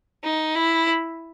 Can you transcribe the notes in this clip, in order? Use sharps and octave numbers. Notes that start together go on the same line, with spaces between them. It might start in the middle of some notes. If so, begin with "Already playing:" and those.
D#4
E4